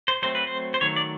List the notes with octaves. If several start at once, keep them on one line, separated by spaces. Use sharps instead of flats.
C5
F#3 A3 C4 C5
B4
C5
C5
D#3 F#3 A3 C#5
D5